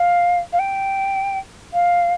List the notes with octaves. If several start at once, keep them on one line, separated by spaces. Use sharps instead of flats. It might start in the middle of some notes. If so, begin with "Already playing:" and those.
Already playing: F5
F5
G5
F5